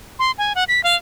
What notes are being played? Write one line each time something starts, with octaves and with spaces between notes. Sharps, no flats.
C6
G#5
F#5
B6
F5